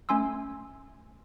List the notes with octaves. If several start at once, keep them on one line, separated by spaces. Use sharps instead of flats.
A3 C#4 G#5 C6 E6